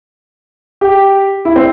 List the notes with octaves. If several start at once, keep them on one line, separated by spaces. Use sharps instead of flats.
G4
E4
C4